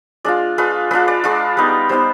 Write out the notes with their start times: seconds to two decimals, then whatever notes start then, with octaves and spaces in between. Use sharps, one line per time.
0.24 G#3 D4 F4 D5
0.58 G#3 D4 F4 B4
0.91 G#3 D4 F4 B4
1.08 D5
1.24 G#3 D4 F4
1.57 G3 B3 D#4
1.89 G3 B3 D#4 C5